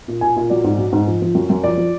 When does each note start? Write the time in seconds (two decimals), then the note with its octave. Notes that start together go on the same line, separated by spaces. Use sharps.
0.08 A#2
0.21 A#2 G#5
0.36 A#2
0.50 F#3 D5
0.64 G#2
0.78 F#3
0.92 G#2
1.07 F3
1.22 F3
1.35 F#2
1.50 F#2
1.64 F3 D5
1.77 F3